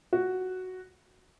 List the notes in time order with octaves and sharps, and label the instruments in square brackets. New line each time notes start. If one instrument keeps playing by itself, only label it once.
[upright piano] F#4